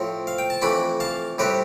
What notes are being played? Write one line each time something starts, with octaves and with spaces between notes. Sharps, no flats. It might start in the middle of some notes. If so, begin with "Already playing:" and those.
Already playing: A2 F3 C4
F5
G5
A5
F2 E3 A3 D4 G5 B5
F5 A5
A2 G3 C4 G4 B4